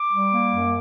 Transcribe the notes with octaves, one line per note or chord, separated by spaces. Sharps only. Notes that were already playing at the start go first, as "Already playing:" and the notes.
Already playing: D6
G3
A#3
F#2